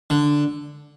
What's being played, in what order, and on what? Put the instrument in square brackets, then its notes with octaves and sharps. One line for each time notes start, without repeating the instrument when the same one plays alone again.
[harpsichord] D3